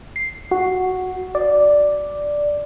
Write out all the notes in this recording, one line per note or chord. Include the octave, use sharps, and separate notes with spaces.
C7
F#4
D5